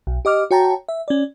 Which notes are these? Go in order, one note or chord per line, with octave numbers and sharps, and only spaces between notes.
B1
G4 D#5 D6 F6
F#4 C#5 G5 A5 A#5
E5
C#4 D5